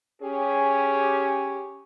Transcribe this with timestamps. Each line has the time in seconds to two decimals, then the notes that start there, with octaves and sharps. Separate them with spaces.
0.22 C#4 G4 G#4